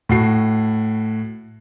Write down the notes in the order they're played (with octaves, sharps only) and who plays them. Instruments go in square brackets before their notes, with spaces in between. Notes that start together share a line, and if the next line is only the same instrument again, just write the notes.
[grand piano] A2 F#4 C7